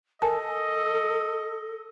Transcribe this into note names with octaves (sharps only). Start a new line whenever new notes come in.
A4 A#4 D#5 G#5 A5